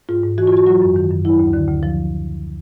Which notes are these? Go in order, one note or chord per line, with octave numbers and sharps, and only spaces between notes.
G#2 F4
G#2
E3 F#4
F4
E3 F#4
F#3 F4
F#2
D#3
F#2
F#3 E4
D2
D3
D2
F3